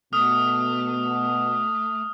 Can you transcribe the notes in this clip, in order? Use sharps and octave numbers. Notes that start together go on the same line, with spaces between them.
B2 A3 D#6 F6